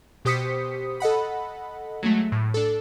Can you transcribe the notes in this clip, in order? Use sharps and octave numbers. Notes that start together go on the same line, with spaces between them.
B2 G4 C5 D#6 B6 C#7
A4 D#5 F#5 B5
F#3 G#3 A3
A2
D4 A4